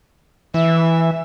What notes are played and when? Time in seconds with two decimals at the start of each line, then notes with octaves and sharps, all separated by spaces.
0.54 E3 E5